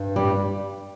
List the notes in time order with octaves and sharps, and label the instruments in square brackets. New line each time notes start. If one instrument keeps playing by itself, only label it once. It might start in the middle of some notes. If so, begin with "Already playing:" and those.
Already playing: [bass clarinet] G2
[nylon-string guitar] G3